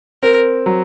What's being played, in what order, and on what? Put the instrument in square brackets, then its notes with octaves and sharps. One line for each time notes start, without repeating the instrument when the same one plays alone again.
[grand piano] C4 [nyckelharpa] A#4
[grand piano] F#3